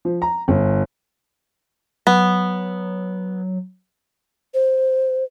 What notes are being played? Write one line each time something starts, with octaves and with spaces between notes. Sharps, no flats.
F3
A#5
G1
F#3 B3
C5